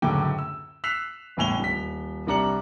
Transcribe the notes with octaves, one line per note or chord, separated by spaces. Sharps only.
C#2 F#2 A2 D3 G5 D6
E6
E6 F#6 B6 C7 F7
G1 E2 A2 G#5 F7 G7
D#1 B6
C2 G3 D4 A#5 C#7 F#7